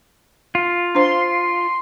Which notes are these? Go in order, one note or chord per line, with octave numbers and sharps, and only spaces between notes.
F4
D4 C5 C6